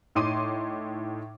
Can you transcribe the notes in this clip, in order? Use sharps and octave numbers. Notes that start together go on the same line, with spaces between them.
A2 D#4 C#5 C6 D6 D#7